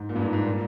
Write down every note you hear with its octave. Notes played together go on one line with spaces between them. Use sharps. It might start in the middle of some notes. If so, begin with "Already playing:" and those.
Already playing: G#2
A#2
G2
G#2
G#2
A#2